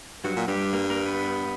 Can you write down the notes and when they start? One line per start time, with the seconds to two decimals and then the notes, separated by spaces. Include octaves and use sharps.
0.24 G2 F#3 F#4
0.36 A#2
0.47 G2 G3 G4
0.73 A#3 A#4
0.90 A#3 A#4
1.06 B3 B4